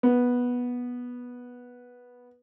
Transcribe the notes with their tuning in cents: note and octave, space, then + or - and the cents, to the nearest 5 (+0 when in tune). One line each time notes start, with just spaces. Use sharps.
B3 -10